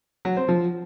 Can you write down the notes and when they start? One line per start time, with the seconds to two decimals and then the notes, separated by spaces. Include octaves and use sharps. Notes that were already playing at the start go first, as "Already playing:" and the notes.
0.25 F#3
0.37 C4
0.48 F3